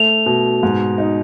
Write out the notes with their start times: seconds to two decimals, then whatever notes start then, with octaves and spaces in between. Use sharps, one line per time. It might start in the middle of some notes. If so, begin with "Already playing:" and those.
Already playing: A3 F7
0.26 B2
0.63 G#2
0.98 D#4